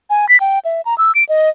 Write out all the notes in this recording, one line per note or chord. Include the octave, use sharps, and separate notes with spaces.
G#5
B6
G5
E5
A#5
E6
D7
D#5